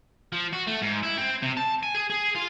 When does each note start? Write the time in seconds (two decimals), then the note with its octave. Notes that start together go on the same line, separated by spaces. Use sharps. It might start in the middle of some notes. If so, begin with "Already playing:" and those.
0.32 F3
0.53 F#4
0.67 A3
0.82 G#2
1.03 E4
1.18 C4
1.42 C3
1.57 A5
1.83 G#5
1.95 G#4
2.10 G#4
2.35 F4